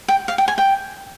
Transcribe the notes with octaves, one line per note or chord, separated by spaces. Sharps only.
G5
F5
G5
G#5
G5